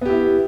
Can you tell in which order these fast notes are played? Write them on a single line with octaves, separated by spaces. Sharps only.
B3 G4 E4